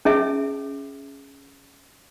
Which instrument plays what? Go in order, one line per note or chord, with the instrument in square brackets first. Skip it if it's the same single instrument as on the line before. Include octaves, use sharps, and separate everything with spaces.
[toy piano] C#4 G#4 E5